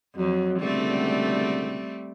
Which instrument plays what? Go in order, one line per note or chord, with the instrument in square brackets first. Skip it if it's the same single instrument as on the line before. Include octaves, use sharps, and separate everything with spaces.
[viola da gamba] F2 [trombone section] F#3
[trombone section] C#2 B2 D3 [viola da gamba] G3 A3 C4